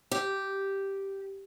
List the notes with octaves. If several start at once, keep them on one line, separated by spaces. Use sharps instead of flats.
G4